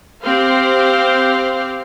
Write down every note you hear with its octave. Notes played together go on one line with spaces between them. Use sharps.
C4 G4 C5 F5